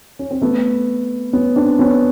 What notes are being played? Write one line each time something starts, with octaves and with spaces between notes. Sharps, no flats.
C#4
C4
A3 B3
B3 C#4
C4 D4
B3 C#4